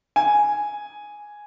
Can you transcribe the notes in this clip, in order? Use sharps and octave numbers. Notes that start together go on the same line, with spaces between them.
G#5